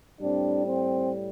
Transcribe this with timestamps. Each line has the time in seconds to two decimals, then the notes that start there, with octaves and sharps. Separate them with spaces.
0.21 A2 G3 C4 D4
0.65 C4